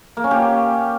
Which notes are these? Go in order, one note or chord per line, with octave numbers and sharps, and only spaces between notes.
A#3
C#4
G4